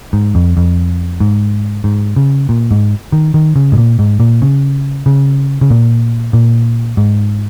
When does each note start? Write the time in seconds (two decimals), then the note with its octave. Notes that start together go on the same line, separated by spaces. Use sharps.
0.13 G#2
0.35 F2
0.57 F2
1.20 G#2
1.84 G#2
2.16 C#3
2.49 A#2
2.71 G#2
3.12 D#3
3.34 D#3
3.56 C#3
3.72 G#2
3.78 A#2
3.99 G#2
4.20 A#2
4.42 C#3
5.06 C#3
5.61 C#3
5.70 A#2
6.33 A#2
6.97 G#2